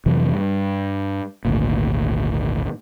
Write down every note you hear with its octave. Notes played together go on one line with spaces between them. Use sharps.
F2 C3 E3 F#3
G2
G#1 D2 A#2